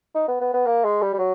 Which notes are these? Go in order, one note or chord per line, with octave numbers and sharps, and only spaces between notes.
D#4
B3
B3
B3
A#3
G#3
G3
G3
F#3